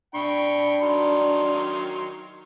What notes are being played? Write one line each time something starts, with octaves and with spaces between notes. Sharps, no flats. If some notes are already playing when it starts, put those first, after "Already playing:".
D4 G5 B5 C#6
D#3 F#3 C6